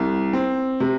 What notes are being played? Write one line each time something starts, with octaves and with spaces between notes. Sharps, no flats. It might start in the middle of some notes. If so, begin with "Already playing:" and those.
Already playing: C2
C4
C3